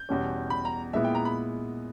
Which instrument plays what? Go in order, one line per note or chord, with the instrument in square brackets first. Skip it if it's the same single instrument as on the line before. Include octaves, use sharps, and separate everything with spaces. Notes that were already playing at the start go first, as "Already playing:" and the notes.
Already playing: [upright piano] G6
[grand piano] E2 B2 G3 C#4
[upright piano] B5
A#5
[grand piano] A#2 G#3 B3 E4 [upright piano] E5
[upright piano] G5
A#5
B5